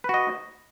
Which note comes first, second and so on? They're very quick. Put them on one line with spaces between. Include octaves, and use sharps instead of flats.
B4 F#4 D#5